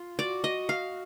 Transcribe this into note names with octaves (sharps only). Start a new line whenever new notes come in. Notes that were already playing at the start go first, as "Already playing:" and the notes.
Already playing: F4
F#4 D5
D#5
F5